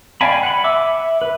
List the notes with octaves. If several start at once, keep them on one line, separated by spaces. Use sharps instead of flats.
D5 F5 G5 G#5 B5
F#5 B5
E5 D6 E6
B4